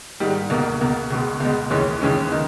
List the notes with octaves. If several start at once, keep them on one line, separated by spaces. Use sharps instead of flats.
G#2 D#3 G3
C#2 B2 A#3
C#2 B2 A#3
C#2 B2 G#3
C#2 B2 G#3
D#2 C#3 E3 G#3 C#4
D#2 C#3 E3 G#3 C#4
D#3